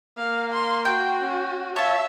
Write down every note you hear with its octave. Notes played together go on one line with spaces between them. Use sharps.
A#3 F5
C6
F#4 G5
C#4
F4 C#5 E5 A5